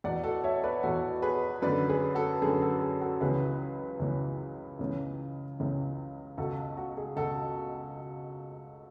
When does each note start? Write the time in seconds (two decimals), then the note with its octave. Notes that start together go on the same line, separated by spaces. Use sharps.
0.04 E2 B2 D5 F#5
0.23 F#4 A4
0.44 C#5 E5
0.64 B4 D5
0.83 E2 B2 F#4 A4
1.22 G#4 B4
1.62 F#2 D3 B4 D5
1.89 G#4 B4
2.15 F#4 A4
2.42 F#2 D3 G#4
2.62 F#4 A4
2.82 G#4
3.01 F#4 A4
3.21 C#2 C#3 E3 G#4 B4
4.00 C#2 C#3 E3
4.79 C#2 C#3 E3
5.59 C#2 C#3 E3
6.38 C#2 B2 F#4 A4
6.77 F#4
6.97 G#4
7.17 C#2 B2 F#4 A4